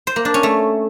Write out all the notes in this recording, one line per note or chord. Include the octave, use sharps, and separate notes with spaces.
C5
A#3
D4
C#4
A3